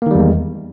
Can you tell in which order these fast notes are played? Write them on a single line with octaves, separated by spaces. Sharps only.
A#3 D#3 G3 E2 G#3